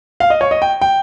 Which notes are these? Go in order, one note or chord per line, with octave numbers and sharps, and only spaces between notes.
F5
D#5
C#5
D#5
G5
G5